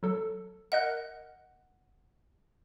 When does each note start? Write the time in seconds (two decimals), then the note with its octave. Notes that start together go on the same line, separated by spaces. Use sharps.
0.03 F#3 A4
0.72 A#4 D#5 F#5 F#6